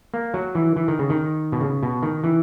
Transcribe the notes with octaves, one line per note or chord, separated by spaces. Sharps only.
A#3
F#3
E3
E3
D#3
C#3
D#3
B2
C#3
B2
D#3
E3